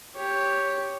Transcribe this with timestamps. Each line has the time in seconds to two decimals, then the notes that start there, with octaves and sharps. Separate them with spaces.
0.16 G4 C#5